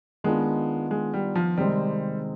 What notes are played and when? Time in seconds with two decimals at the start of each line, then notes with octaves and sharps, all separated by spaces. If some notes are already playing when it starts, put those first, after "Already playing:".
0.24 D#3 G#3 B3 D4 F4
0.91 G#3
1.14 G3
1.36 F3
1.57 C3 D#3 G3 G#3 C4